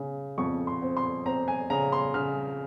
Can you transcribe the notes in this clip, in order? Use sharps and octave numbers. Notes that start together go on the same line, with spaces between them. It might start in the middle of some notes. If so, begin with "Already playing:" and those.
Already playing: C#3
F2 C#6
C6
C4
C6
C4 A#5
G#5
C#3 A#5
C6
C#3 F6